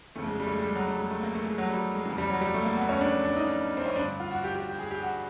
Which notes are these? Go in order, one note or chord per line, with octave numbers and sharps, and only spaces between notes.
F2 C#3 E3 A3
G#3
G3
A3
G#3
G3
G#3
F#3
G3
G#3
A3
A#3
A3
G#3
F#3
G3
G#3
F2 C#3 E3
G3
F#3
G3
A3
A#3
B3
C#4
D4
D4
D#4
C4
C#4
G2 D3 D4
F4
F#4
G4
G4
G4
G#4
G4
F#4